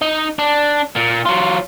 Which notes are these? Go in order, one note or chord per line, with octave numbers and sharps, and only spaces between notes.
D#4
D4
A#2
F#3 F4